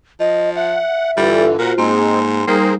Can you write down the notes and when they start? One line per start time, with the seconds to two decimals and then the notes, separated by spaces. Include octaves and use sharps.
0.20 F3 D#5
0.56 E5 F#5
1.17 G2 D3 E3 G3 F4 A4
1.59 A#2 F4 F#4 A#4 C5 F#5
1.78 G#2 G#3 A#3 C4 C6
2.48 G3 A#3 D#4 G#4 A#4 C5